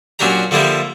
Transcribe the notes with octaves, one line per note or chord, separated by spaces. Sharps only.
A#2 F#3 C#4 D4 G4 A#5
D3 F3 G3 A#3 E4